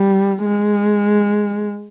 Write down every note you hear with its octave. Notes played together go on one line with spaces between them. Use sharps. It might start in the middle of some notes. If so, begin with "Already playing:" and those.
Already playing: G3
G#3